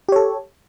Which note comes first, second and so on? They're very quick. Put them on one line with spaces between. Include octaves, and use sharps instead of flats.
G4 C#5 A4